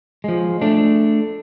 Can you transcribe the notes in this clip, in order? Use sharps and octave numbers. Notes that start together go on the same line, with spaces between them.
F3 G#3
A3 D4